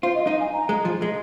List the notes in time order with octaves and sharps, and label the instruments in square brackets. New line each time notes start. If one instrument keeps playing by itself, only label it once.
[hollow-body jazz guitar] F4 [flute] C5
[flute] D#5
[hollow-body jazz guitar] D#4 [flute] F5
[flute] G#5
A#5
[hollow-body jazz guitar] G#3
F3
G#3